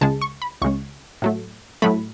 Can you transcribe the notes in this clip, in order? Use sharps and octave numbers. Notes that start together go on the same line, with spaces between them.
C#2 C#3 G#3 A5
C#6
B5
C#2 C#3 G#3 C#6
A2 F#3 A3
A2 F#3 A3 B5